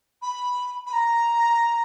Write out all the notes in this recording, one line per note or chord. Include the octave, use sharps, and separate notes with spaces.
B5
B5
A#5